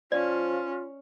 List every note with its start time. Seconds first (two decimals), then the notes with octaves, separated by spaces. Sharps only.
0.12 F3 C#4 F4 D5